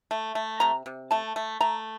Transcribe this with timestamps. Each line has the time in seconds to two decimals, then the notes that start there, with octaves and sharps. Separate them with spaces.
0.11 A3
0.35 A3
0.60 C3 A#5
0.86 C3
1.11 A3 A5
1.36 A3
1.61 A3 A#5